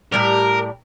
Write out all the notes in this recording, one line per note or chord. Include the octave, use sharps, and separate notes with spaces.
A2 G3 A#4 D5